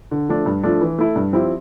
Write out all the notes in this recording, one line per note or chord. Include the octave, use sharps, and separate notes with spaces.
D3
F3 A3 D4
G2
F3 A3 D4
E3
A3 E4
G2
F3 C4 E4 G4